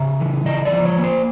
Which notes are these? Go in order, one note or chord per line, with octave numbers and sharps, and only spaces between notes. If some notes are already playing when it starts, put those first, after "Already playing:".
Already playing: C#3 E5
E3
C#3 D#5
D5
F3
C#5
A#3
C5